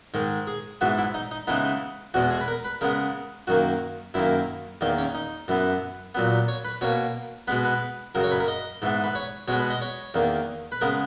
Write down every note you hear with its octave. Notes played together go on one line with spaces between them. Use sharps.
G#2 D#3 G#3
G#4
G#2 E3 B3 F#4
E4
D#4
D#4
C#3 E3 G#3 B3 D#4
E2 B2 G#3 F#4
G#4
B4
A#4
B4
C#3 G#3 B3 A#4
F#2 D#3 A#3 F#4
F#2 D#3 A#3 E4
E2 D#3 A#3 D#4
C#4
D#4
F#2 E3 B3
A#2 F#3 B3
C#5
B4
B2 A#3 C#5
B2 G#3 B3 B4
B4
F#2 C#3 F#3 A#4
C#5
B4
A#4
D#5
G#2 E3 B3
B4
C#5
B2 G#3 B3 C#5
B4
D#5
C#5
E2 D#3 A#3
B4
C#3 G#3 B3 A#4